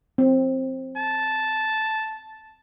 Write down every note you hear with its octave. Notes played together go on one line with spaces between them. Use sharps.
C4
A5